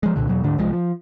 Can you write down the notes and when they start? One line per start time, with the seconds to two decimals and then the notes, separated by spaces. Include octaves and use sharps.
0.03 F3 G#3
0.16 C2 A#2 D3
0.29 E2 B2 F#3
0.44 D2 G#2 D3 D4
0.58 C2 F3 G#3
0.73 F3